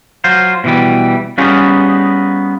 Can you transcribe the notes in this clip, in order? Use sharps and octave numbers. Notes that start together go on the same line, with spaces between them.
F#3 F4 C5
B2 E3 G3
G3 B3 C#4 D#4 F4 G#4